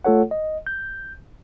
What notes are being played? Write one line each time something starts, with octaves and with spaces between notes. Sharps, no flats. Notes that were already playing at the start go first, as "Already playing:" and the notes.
A3 F4 A4 C#5 F#5
D#5
G6